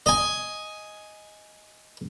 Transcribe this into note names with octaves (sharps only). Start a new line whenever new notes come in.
D#5 G#5